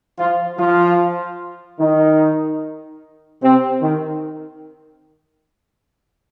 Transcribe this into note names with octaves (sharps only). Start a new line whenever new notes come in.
F3 F4
F3 F4
D#3 D#4
C3 C4
D#3